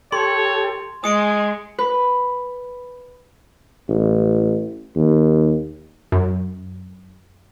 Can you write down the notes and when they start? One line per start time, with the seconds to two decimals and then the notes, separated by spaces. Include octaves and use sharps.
0.12 G4 A4 C#5 C6
1.04 G#3 G#5 C6 D#6 C#7 D7
1.78 B4
3.89 A1
4.96 D#2
6.12 F#2